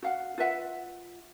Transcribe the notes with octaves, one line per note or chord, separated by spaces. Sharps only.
F#4 F5 F#5
F4 B4 E5 F#5